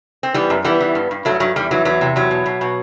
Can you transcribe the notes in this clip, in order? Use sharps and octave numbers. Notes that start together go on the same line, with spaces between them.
C4
E3 G3 B3
F#2
E3 G3 B3
E3
G2
G2
G2 F#3 A3
G2 F#3
E2 G3
E3 F#3
E2 F#3
C3
E2 F#3
B2
B2
B2